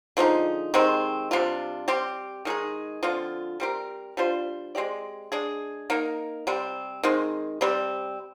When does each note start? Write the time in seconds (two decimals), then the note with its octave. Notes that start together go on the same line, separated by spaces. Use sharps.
0.17 D3 F3 G#3 D#4
0.74 C3 D#3 G#3 C4
1.31 C3 G3 D4 F4
1.88 G3 C4 G4
2.45 D#3 G#3 D#4 G#4
3.03 D3 F3 C4 F4
3.60 G3 C4 G4 A#4
4.17 G3 D4 F4 C5
4.75 G#3 C4 G4 D5
5.32 G#3 D4 G#4
5.90 A#3 D#4 A#4
6.47 C3 G3 C4
7.03 D#3 G#3 C4
7.61 C3 G3 C4